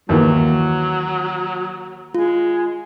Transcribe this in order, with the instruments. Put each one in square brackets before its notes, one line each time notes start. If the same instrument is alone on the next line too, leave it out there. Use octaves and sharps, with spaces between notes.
[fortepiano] D#2 E3 A#3 [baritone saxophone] F#3
[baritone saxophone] G#3 [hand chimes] F4